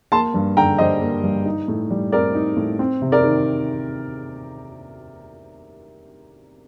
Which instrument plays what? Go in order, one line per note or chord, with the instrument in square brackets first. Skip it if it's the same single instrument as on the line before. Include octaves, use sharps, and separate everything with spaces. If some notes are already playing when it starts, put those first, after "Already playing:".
[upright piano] A#3 A5 C6
G2
D3 G5 A#5
G3 C5 D#5
A#3
G2
D#4
A2
G3
C4 A#4 D5
D#4
A2
C4
C3
A#4 D5
D#3